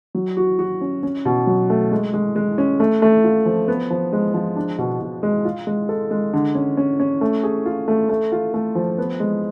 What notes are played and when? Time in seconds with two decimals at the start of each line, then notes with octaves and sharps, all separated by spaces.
0.15 F#3
0.37 F#4
0.59 F#4
0.81 C#4
1.03 C#4
1.25 B2
1.47 F#3
1.70 A3
1.91 G#3
2.14 G#3
2.36 G#3
2.58 C#4
2.80 A3
3.02 A3
3.24 F4
3.46 F3
3.68 B3
3.90 F3
4.13 G#3
4.34 F3
4.56 D4
4.78 B2
5.01 B2
5.23 G#3
5.45 F4
5.67 G#3
5.89 A4
6.11 G#3
6.33 D3
6.55 C#4
6.77 C#4
7.00 C#4
7.21 A3
7.43 G#4
7.66 F4
7.88 A3
8.09 A3
8.32 F4
8.54 A3
8.75 F3
8.98 B3
9.20 G#3